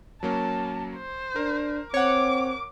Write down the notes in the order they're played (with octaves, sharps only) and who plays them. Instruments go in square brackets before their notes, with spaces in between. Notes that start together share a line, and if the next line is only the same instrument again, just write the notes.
[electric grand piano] F#3 A#3 C#4 [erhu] A5
[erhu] C5
[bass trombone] D4 [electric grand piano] A#4
[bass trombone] C4 [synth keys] C#5 F#5 [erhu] D6